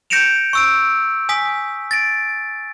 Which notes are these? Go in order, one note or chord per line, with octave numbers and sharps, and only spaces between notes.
G6 A#6 C#7 D7 E7 F7
C#6 E6 D7
G#5 D#6 B6
A6 A#6 D7